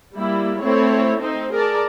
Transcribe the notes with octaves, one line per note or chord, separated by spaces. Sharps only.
G3 A#3 E4
A3 C4 E4 C#5
C4 D#4 C5
G#4 A#4 D5 A5